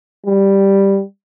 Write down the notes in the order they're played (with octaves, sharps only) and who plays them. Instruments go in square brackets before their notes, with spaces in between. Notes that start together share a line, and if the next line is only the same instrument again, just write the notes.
[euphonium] G3